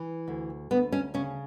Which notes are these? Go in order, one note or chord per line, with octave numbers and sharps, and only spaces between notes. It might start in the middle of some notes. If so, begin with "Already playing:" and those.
Already playing: E3
D2
D2 B3
C#4
C#3 C#4